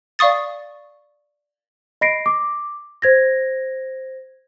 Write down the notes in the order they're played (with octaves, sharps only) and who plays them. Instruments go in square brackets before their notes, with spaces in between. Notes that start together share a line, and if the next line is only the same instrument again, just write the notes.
[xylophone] D5 F5 C#6 D#6 A6
[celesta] D#5 B5 A#6 C7 D7
D6
C5 G#6 A#6